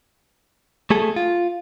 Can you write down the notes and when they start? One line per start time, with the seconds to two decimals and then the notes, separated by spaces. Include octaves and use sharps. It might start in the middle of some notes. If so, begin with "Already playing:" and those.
0.90 A3 G#4 A4
1.16 F4